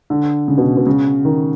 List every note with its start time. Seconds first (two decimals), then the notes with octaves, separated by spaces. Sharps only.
0.10 D3
0.48 C#3
0.58 B2
0.77 B2
0.87 C#3
1.25 D#3